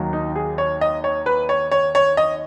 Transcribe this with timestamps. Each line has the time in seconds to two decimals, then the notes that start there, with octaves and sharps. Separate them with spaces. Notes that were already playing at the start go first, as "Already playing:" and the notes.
Already playing: D#2 D#3 F#3
0.13 D#4
0.36 G#4
0.58 C#5
0.81 D#5
1.04 C#5
1.26 B4
1.49 C#5
1.71 C#5
1.95 C#5
2.17 D#5